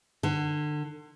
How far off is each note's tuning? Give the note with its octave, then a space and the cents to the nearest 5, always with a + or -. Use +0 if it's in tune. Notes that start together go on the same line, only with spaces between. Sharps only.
D3 +30